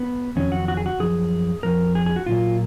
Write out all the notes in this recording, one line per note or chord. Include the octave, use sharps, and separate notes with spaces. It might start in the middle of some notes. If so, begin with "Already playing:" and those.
Already playing: B3
F2 D#3 F#3 C#4
F#4
F#4
G#4
F#4
F#2 F3 G#4
F2 F3 A#4
G#4
G#4
F#4
A#2 F#3 A#3 F4